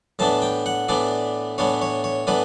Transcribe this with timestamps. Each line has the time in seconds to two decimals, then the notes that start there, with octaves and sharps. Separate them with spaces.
0.19 A2 E3 B3 D4 A5
0.42 G5
0.66 F#5
0.89 A2 E3 B3 D4 D5
1.58 A2 E3 B3 D4 C#5
1.81 C#5
2.04 C#5
2.27 A2 E3 B3 D4 B4